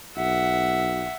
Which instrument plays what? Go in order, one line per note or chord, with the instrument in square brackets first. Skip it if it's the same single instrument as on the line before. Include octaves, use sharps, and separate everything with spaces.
[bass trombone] B1 [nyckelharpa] E5 F#5